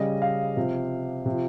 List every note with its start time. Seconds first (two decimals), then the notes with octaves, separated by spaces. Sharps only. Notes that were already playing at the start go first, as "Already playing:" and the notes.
Already playing: C#3 G3 D#5
0.22 F5
0.56 C3 F3
1.26 C3 F3